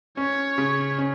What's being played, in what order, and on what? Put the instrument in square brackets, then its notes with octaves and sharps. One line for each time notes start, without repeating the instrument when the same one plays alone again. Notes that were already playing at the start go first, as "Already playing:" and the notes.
[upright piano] C#4 [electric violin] C#5
[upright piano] C#3
C#4